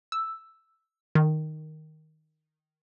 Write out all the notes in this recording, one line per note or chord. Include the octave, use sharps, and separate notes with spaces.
E6
D#3